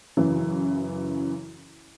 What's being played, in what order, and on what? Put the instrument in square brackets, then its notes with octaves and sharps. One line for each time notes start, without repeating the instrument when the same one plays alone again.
[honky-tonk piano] F#2 C#3 E3